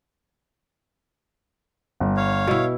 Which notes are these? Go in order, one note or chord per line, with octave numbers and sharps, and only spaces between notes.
G1
C#5 F5
B2 E4